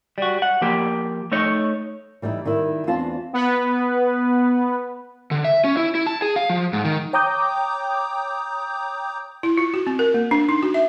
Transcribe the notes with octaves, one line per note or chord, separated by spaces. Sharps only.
G3 F#4
F#5
F3 A#3 G4
A3 D#4 C#5
E3 G3 D#4 E4
D#3 G3 E4
E2 C4 D4 F4 B4 A5
B3 B4
D3
E5
C#4
E4
E4
A5
G#4
F5
F3
G#2
D#3
C#5 G5 A#5 D6 D#6 G6
E4
F4
F#4
C4
A#4
A#3
D4
D#4
F#4
E5